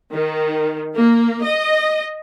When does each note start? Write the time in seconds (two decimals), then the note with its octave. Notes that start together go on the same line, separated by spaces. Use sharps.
0.13 D#3
0.96 A#3
1.44 D#5